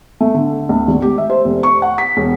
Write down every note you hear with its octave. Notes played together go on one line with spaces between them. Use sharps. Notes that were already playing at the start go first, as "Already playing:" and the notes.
A3
D3
D2
G#1
G4
E5
C5
F1
C#6
F#5
B6
E1